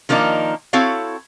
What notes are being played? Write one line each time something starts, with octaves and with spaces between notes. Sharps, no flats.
D#3 F3 A#3 D4 D#4
C4 E4 F#4 A4 C#5 F5